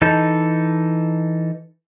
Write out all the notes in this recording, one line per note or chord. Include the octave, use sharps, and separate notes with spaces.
E3 D#4 A4